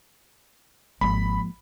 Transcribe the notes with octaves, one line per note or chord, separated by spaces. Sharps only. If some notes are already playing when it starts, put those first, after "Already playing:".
G#1 F3 G#3 A#3 B5